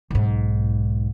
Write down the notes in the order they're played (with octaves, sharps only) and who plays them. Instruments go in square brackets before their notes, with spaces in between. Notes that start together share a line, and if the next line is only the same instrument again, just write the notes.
[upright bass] B1 G#2